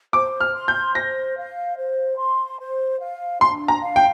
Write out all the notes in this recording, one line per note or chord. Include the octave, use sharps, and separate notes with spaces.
C5 D6
F6
C6
G6
C5 A#6
F5
C5
C6
C5
F5
D4 C6
A#5
F5
G5